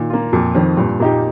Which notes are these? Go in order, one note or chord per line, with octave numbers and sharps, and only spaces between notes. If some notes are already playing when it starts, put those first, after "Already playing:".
Already playing: A#2 D#3
A#3 F4
F2 A#2
F2 D#3 C4
G2 A#2
A#2 A#3 D#4 G4